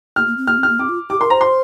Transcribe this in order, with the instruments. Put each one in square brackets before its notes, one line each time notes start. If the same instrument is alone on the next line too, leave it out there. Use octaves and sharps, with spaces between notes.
[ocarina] A#3 [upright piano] F6
[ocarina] A#3
C4
[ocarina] A#3 [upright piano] F6
[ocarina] C4
[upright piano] F6
[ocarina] A#3
[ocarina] C4 [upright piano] D6
[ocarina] F4
[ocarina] G4 [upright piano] D6
[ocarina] A#4 [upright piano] C6
[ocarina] C5 [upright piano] A#5
[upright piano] C6